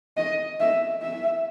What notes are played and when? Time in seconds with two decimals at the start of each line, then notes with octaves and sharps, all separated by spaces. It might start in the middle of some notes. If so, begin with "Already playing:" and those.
0.17 D#5
0.60 E5
1.03 E5